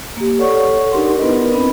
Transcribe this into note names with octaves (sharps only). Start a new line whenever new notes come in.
A#3 G4
A4 C#5 D5 F#5 C#6
D4 D#4 G4 A#4 F#5 C6
B3 D#4 E4 A#4 B4 D#5
C4 D4 B5